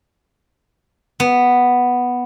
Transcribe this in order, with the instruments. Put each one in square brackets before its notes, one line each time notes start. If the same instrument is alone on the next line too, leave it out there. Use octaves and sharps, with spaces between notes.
[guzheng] B3